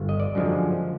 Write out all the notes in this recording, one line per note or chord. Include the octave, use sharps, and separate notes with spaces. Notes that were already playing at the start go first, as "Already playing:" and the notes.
Already playing: G1
D#5
D5
F#2 D3 F3 G#3